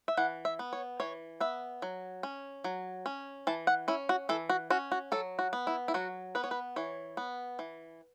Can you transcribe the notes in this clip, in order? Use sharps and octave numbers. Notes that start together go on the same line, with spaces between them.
E5
E3 F#5
E5
B3
C#5
E3 C#5
B3 E5
F#3
C#4
F#3
C#4
E3 A5
F#5
C#4 E4
F#4
E3 A4
F#4
C#4 F#4
F#4
F#3 A4
F#4
B3
E4
E4
F#3 F#4
B3 B4
C#5
B4
E3 C#5
B3
E3